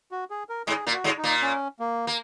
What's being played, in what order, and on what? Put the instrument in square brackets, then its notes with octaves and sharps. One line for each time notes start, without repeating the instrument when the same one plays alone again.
[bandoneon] F#4
G#4
A#4
[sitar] G#2 G#3 [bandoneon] G#4
[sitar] A#2 A#3
[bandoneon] F#4
[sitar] G#2 G#3
[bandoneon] D#4
[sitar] A#2 A#3
[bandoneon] C#4
A#3
[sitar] A#3